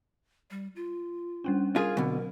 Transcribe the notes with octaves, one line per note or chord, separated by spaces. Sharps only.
G3
F4
G3 C#4 D4
F4 G#4 A#4
B2 D3 F#3 C4